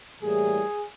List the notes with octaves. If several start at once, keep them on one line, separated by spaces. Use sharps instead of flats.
A2 E3 G3 A#3 G#4